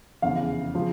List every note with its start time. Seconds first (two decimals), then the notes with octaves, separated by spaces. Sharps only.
0.22 F1 E2 C#3 F5
0.75 C#3 F3